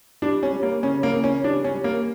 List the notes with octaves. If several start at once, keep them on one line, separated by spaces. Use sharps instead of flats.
G3 D4
C#4
G3
A#3
C#3 C#4
A#3
C#3
C#4
G3 D4
C#4
G3
A#3